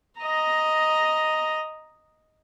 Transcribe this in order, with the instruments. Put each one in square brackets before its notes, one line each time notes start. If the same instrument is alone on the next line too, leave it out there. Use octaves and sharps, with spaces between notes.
[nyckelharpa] D#5 A#5